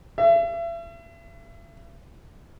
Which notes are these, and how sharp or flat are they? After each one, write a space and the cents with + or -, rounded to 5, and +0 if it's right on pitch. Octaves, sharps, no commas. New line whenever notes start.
E5 +40